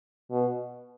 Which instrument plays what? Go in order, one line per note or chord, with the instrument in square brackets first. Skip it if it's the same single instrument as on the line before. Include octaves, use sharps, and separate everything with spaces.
[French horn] B2